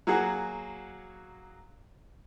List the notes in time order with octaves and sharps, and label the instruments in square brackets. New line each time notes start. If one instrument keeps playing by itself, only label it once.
[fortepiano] F#3 A#3 F#4 G#4